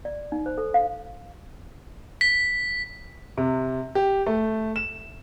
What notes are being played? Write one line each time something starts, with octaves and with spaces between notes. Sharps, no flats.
D5
D#4
C5
A4
F5
B6
C3
G4
A3
E7